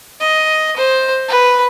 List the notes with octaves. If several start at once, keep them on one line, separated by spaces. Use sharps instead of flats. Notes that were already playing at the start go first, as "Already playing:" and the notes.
D#5
C5
B4